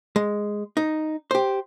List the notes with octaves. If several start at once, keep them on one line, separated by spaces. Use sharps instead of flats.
G#3
D#4
G4 C5